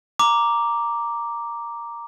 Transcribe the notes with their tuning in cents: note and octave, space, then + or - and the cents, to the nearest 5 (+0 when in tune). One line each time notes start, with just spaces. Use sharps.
A#5 +0 D6 +0